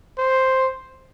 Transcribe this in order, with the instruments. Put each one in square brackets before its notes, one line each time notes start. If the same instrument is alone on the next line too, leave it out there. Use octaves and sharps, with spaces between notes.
[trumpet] C5